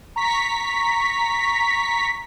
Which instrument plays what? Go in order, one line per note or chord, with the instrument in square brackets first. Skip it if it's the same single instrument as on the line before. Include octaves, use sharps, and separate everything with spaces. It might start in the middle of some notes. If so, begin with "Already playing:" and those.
[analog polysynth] A#5 C#6 B6